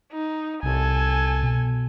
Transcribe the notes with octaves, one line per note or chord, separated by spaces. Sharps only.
D#4
C2 A4 G#5
B2